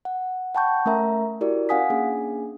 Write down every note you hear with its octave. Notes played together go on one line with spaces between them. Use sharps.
F#5
F#5 G5 A5 B5 C#6 G6
A3 C#4 A#4 E5 A#5
E4 F#4 G4 A#4 D5
C#4 F5 F#5 G#5 D#6 B6
A#3 C#4 D4 G#4 G#5